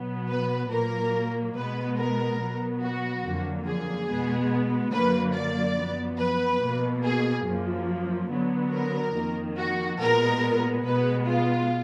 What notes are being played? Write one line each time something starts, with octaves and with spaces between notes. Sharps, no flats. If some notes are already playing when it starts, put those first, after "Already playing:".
Already playing: B2 F#3 B3
B4
A#2 F#3 A#3 A#4
B2 G#3 B3 B4
A#4
B2 F#3 B3
F#4
F2 D3 F#3 A#3
G#4
B2 G#3 B3
F#2 D3 F#3 A#3 B4
D5
F#2 F3 B3
B4
B2 A#3
G#4
F#2 F3 A#3
D3 F#3 B3
A#4
F2 D#3 A#3
F#4
A#2 G#3 B3 A#4
B2 G#3 B3 B4
F4